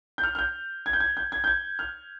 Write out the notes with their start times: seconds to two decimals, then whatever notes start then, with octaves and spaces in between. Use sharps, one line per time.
0.18 G6
0.23 F6
0.35 F6
0.39 G6
0.86 G#6
0.93 G6
1.00 G#6
1.17 G6
1.32 G#6
1.44 G6
1.47 G#6
1.79 F6